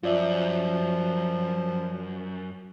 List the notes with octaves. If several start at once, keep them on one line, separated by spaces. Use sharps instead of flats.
F#2 F3 F4 D5 E5